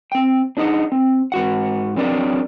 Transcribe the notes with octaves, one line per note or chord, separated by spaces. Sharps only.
C4 G5
D4 D#4 G#4 D#5 F#5
C4
G#2 F#4 F#5
F#3 C4 D4 A#4 D5